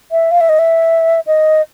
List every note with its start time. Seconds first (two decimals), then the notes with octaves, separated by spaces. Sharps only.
0.12 E5
0.31 F5
0.41 E5
0.49 D#5
0.59 E5
1.27 D#5